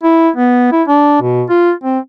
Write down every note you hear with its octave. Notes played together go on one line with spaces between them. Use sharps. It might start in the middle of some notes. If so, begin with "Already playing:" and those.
E4
B3
E4
D4
B2
F4
C4